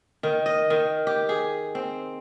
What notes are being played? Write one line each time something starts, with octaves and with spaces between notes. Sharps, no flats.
D#3
D#5
D#3
G4
G#4
C4